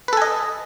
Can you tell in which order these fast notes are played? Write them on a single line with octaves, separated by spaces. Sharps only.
B4 A4 G#5 D#5